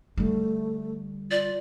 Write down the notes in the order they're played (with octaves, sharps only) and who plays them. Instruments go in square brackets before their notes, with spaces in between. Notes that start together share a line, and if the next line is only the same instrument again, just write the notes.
[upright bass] D3 G3 [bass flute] A3
[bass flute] F4 [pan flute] D5